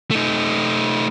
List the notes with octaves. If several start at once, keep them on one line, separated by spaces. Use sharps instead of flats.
A3 D#4